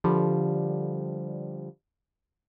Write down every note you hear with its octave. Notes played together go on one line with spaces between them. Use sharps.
D3 F3 G3